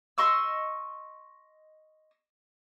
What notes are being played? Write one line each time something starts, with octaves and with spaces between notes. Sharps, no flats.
D#5 C6 C#6 E6